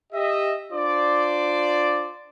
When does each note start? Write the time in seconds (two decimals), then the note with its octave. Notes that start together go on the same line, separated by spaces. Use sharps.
0.13 G4 D#5 E5
0.72 D4 F4 C5 D5